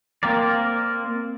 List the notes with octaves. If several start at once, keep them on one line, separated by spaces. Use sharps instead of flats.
A#3 C4 A#4 D5